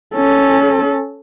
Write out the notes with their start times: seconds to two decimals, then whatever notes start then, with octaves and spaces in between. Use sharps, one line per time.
0.15 C#4 A4